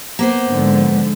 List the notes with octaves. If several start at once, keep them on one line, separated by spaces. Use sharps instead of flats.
A#3 B3 C5
G#2 D3 F3